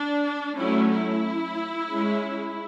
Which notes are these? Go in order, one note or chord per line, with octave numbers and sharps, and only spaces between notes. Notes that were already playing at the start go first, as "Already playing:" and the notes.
Already playing: D4
F#3 A3 C#4 E4
E4
G#3 C#4